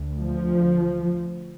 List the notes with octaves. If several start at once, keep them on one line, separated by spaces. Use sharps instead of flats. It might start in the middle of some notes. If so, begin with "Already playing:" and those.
Already playing: D2
F3